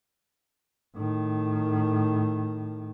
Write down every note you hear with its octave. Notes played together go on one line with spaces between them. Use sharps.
A2 D#3